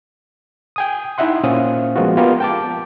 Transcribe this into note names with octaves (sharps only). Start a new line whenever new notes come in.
G5 G#5 D#6
D#4 E4 D#5 E5 F#5 C6
A#2 C#4 C5 F5 D#6
F3 G#3 A#3 B3 F4 F#4
B3 F4 G4 A#4
G5 A5 D6